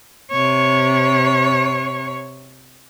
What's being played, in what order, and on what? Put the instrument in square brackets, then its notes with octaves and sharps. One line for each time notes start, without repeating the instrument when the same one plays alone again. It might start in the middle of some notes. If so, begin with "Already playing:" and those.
[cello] C3 C#5